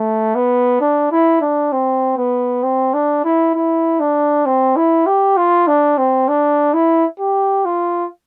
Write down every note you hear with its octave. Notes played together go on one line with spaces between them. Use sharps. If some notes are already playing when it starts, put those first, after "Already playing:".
Already playing: A3
B3
D4
E4
D4
C4
B3
C4
D4
E4
E4
D4
C4
E4
G4
F4
D4
C4
D4
E4
G4
F4